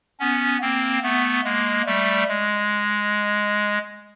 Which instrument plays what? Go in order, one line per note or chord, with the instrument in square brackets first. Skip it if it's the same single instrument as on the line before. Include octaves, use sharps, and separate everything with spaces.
[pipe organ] B3 C#4
A#3 C4
A3 B3
G#3 A#3
G3 A3
G#3